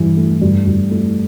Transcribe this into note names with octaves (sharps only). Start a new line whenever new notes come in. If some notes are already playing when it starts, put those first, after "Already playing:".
Already playing: G2 E3
A3
G2
G2
A3